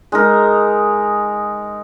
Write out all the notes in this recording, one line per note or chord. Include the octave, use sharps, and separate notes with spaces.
G#3 D#4 A#4